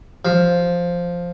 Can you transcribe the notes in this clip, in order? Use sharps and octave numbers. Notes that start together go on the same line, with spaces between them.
F3